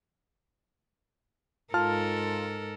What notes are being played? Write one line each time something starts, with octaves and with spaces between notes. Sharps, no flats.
G#2 F4 A4 A#4 A5 F6